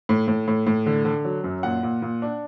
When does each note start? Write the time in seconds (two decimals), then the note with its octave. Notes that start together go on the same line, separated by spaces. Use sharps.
0.09 A2
0.28 A2
0.48 A2
0.67 A2
0.86 D3
1.05 D3
1.25 F#3
1.44 F#2
1.63 A#2 F#5
1.83 A#2
2.02 A#2
2.22 D4